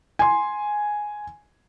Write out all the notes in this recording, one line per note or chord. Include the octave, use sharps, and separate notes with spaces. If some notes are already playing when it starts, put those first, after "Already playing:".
G#5 C6